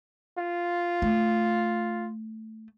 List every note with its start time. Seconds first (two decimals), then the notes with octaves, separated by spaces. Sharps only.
0.38 F4
1.02 A3